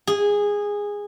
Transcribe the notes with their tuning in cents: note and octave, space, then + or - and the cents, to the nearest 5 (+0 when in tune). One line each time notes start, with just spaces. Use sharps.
G#4 -15